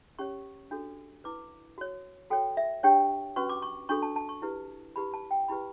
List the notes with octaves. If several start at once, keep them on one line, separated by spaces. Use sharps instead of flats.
C#4 G4 C#5 C#6
D4 F#4 A4
E4 B4 D6
F#4 C#5
F#4 A4 C#5 G5
E5
D4 G4 C#5 G5
C#4 F#4 B4 C#6
D6
C#6
D4 F#4 A4 C#6
A5
A5
C#6
E4 G4 B4
E4 G4 B4 B5
A5
G5
E4 G4 B4 B5